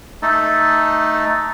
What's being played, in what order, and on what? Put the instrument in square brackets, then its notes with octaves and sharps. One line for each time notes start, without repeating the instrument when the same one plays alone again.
[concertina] A3 D#4 A4